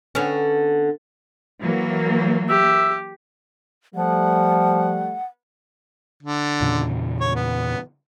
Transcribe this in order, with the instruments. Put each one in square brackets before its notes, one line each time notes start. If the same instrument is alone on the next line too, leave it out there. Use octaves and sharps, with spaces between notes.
[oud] D3 B3 C#4
[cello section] E3 F#3 A#3
[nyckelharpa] G4 [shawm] E5
[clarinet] F3 [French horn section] G3 A3 [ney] F#5
[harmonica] D3
[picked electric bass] E2 A#2 C#3
[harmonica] C#5
B3